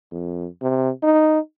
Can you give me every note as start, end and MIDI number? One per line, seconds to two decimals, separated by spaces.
0.11 0.46 41
0.62 0.90 48
1.03 1.39 63